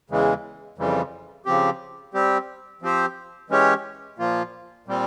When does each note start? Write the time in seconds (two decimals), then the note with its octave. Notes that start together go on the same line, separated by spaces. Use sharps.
0.10 E2 C#3 E3 G#3
0.78 F2 C#3 E3 G3
1.46 C#3 F3 C4 G4
2.14 G3 C4 G4
2.82 F3 C4 G4 C5
3.50 E3 G#3 C#4 G4 C#5
4.19 A#2 F3 A#3 F4
4.86 A#2 G3 C4